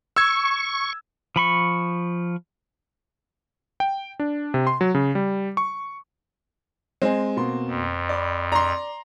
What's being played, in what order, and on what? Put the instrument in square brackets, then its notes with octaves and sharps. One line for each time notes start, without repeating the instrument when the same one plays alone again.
[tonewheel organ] C#6 [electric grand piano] E6 G#6
[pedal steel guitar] F3 B5 C#6
[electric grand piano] G5
D4
C3
C6
F#3
C#3
G3
C#6
[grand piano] G#3 G#5 [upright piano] C4
[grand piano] B2 A#3 C6
[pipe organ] F2
[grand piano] D5 B5
[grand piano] D5 [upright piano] A#5 C6